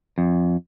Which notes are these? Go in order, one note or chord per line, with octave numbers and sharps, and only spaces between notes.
F2